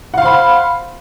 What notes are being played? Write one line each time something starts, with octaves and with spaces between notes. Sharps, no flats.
C5 F5 F#5 B5